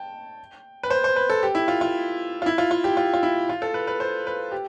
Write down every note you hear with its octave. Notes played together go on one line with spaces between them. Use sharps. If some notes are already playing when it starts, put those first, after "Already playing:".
Already playing: G5 A5
B4
C5
C5
B4
A4
G4
E4
F4
F4
F4
E4
F4
F4
G4
F4
F4
E4
F4
A4
B4
B4
C5
B4
G4